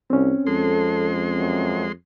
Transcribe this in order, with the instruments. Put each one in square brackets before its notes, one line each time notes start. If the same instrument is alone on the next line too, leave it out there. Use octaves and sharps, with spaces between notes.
[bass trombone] C2 [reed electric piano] C4 C#4
[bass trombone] F2 [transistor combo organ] G#3 C6 [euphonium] A4
[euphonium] F#2